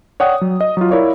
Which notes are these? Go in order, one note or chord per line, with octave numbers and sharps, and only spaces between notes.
C#5 D5 F#5 G5 D#6
F#3
D#5
F#3 F4
E4 A#4 C#5 D5 F5